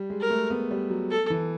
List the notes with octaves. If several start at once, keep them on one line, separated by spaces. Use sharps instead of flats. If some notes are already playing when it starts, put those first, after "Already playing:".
Already playing: G3
G#3
A#4
A3
B3
G3
F#3
A4
E3